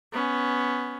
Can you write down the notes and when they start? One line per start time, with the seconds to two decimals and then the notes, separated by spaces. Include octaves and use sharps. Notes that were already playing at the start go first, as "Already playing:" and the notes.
0.13 B3 C#4